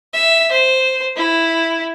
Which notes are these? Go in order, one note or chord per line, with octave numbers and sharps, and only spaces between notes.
E5
C5
E4